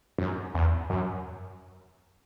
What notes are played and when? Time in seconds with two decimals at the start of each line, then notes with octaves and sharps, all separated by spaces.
0.18 F#2
0.55 E2
0.90 F#2